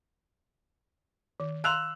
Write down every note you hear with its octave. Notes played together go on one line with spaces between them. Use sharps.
D#3
F5 A#5 C6 E6 F#6 F7